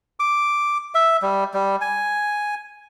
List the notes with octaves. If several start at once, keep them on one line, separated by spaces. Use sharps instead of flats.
D6
E5
G3
G3
G#5